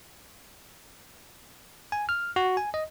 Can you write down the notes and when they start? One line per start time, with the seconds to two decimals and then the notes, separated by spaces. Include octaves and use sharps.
1.92 G#5
2.09 F6
2.36 F#4
2.57 G#5
2.74 D#5